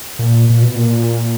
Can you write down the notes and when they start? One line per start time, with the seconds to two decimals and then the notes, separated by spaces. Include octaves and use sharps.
0.19 A#2
0.50 A#2
0.63 B2
0.76 A#2